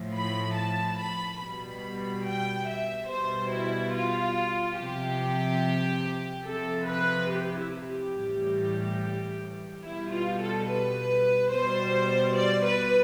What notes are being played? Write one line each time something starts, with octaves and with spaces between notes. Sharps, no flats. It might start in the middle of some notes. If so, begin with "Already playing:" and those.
Already playing: A2 F3
B5
A5
B5
B2 G3 B5
G5
E5
B2 G3 C5
E4
F4
C3 F3 G4
C3 F3 A4
B4
G4
E4
G4
A2 E3 G3
B2 G3 E4
F4
A4
B4
B2 G3 C5
D5
B4